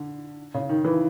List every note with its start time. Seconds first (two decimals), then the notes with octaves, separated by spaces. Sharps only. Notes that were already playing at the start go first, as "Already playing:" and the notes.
Already playing: D3
0.54 C#3
0.69 D#3
0.85 E3